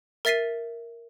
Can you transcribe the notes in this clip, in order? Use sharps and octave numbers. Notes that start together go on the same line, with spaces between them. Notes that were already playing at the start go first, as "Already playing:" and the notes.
A#4 E5 A6 B6 C7 D#7